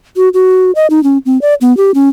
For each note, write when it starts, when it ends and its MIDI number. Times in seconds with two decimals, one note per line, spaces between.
0.17 0.29 66
0.34 0.71 66
0.75 0.87 75
0.90 1.02 63
1.03 1.18 61
1.26 1.40 60
1.42 1.54 74
1.61 1.75 59
1.77 1.91 67
1.95 2.09 61